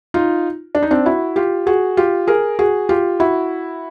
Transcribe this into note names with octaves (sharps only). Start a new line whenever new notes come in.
D#4 F4
D4
D#4
C4 D4
E4 F#4
F4 G4
F#4 G#4
F4 G4
G#4 A#4
F#4 G#4
F4 G4
E4 F#4